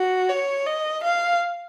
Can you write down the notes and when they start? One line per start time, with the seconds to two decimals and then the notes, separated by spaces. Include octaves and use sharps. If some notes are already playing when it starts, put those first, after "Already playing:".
Already playing: F#4
0.30 C#5
0.66 D#5
1.03 F5